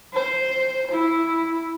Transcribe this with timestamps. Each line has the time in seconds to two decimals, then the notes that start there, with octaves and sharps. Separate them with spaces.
0.14 C5
0.91 E4